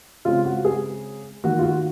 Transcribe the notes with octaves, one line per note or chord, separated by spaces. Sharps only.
C#3 G#3 C4 F4
F#4
G#4
D#3 A#3 F#4
F4
F#4